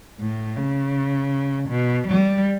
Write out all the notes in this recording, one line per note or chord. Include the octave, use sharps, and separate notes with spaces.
A2
C#3
B2
G3